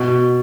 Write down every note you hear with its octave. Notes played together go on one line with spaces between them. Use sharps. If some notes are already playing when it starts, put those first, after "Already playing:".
Already playing: B2